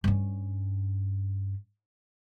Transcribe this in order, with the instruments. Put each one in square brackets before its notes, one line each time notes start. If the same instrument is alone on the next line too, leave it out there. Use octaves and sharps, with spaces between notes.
[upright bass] G2 C#4